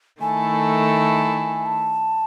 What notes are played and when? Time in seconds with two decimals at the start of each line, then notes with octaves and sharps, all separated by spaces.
0.21 D#3 A3 E4 A4 G#5
1.66 A5